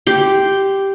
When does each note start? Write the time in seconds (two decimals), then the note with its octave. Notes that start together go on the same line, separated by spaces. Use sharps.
0.07 G4 C6